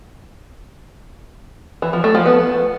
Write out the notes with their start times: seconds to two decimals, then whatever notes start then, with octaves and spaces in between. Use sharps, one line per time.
1.82 E3
1.93 F3
2.04 A3
2.15 F3
2.25 B3